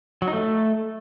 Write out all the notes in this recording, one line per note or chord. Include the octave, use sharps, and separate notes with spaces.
F#3
D#4
A3